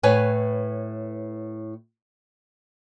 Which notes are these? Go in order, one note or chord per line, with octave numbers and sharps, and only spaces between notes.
A2 B4 C#5 G#5